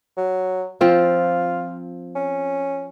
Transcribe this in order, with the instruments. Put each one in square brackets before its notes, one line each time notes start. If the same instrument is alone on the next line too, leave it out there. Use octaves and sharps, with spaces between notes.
[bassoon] F#3
[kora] F3 C4 [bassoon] F4
[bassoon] C#4